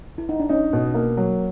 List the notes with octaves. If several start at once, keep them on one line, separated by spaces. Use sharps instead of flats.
E4
D#4
D4
C#4 D#4
B2
A#3
F#3